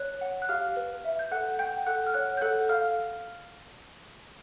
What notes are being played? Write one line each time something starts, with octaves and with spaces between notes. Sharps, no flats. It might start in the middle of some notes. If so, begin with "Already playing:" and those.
Already playing: C#5 F#6
F#5
F#6
G4 F5 F6
B4
E5
G6
A4 F#5 F#6
F#5 G5 G6
A4 F#5 F#6
F6
C#5 F#5 F#6
G6
A4 F#5 F#6
A4 F5 F6